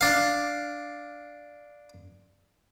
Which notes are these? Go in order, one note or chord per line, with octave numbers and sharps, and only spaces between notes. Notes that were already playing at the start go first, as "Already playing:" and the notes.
D4 F5